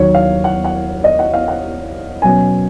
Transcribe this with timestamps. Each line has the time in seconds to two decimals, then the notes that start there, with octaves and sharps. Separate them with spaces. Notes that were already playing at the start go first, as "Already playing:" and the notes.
Already playing: D#2 D#3 F#3 C#5
0.15 F5
0.44 F#5
0.65 F#5
1.04 D#5
1.19 F#5
1.34 F5
1.48 F#5
2.22 B2 F#3 C#4 G#5